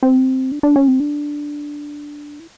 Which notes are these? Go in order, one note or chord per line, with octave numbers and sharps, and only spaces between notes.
C4
D4
D4
C#4
C4
D4
E4